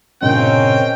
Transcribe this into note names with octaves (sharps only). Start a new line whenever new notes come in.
G2 A#2 C#3 C4 C#4 A#4 D#5 G5